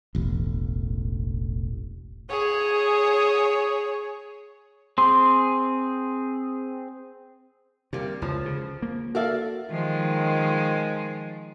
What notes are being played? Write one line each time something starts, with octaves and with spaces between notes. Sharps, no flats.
E1 A1
G#4 C#5
C4 G#4 C6
C3 G3 A#3
C#2 F3
C#3
A#3
F#4 A4 A#4 D5 E5 F5
D#3 F3 G#3